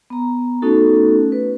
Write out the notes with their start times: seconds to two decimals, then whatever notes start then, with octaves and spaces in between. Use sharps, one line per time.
0.10 B3 A#5
0.62 A3 B3 C#4 D#4 F#4 A4
1.32 B4